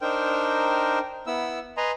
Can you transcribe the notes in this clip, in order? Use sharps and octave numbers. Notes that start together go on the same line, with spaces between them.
D4 D#4 A#4 C5 G5
B3 E4 E6
B4 D#5 G#5 A#5 C6